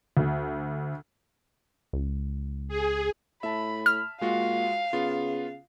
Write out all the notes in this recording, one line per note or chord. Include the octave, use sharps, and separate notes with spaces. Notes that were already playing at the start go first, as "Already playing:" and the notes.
D2
C#2
G#4
A2 E5 A5 B5
F6
A#2 G#3 F4 F#4 F5
C#3 B3 F4